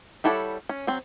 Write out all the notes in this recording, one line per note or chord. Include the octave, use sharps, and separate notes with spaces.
G3 E4 A4 C#5 F#5
C#4
F#3 C4